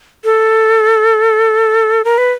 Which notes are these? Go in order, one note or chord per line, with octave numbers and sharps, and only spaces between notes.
A4
A#4
B4